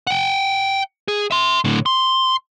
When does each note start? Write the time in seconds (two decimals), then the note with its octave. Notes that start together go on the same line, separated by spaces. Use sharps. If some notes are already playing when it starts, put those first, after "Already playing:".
0.07 F#5 G5
1.08 G#4
1.31 E5 C6
1.64 A2 D3
1.86 C6